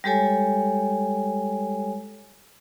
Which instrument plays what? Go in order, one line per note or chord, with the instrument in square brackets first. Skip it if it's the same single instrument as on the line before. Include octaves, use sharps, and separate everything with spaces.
[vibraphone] G3 G#3 G4 A4 C#5 G#5